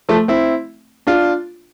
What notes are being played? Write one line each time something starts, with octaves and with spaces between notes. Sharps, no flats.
F3 A3
C4 E4
D4 F4